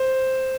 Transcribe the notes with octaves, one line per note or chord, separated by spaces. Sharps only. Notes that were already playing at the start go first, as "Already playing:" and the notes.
Already playing: C5